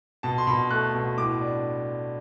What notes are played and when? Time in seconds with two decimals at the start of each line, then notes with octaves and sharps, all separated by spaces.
0.23 B2 A5
0.38 C6
0.47 B2 B5
0.70 A3 F#6
0.95 B2
1.17 A2 D6
1.41 D4